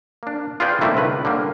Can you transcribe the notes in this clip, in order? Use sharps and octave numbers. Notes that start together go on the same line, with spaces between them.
A#3 D4
F4 G#4 B4 D5 G5 G#5
D#3 G3 A3 A#3 C4 E4
C#2 B4
D3 G3 A#3